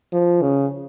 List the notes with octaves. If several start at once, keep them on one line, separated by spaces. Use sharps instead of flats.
F3
C#3